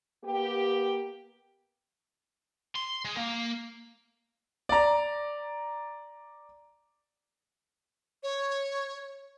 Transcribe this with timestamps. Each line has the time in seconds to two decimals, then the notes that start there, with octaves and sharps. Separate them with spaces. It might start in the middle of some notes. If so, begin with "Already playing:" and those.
0.24 A#3 B3 G4
2.75 C6
3.05 G#3
3.17 A#3
4.69 D5 A#5
8.23 C#5